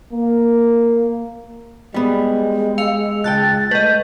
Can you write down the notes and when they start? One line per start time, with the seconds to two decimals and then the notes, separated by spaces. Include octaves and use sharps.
0.13 A#3
1.94 G3 G#3 B3
2.78 F5 E6 C#7 F7
3.24 C#2 G5 A5 F#6 A6
3.71 A3 B4 D#5 G6